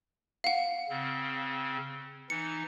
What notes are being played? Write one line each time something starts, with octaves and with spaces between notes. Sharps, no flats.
F5 F#5
C#3 C4
E3 D#4 C#7